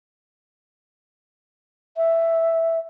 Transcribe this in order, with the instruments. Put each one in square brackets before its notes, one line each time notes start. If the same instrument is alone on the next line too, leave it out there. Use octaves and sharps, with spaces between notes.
[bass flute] E5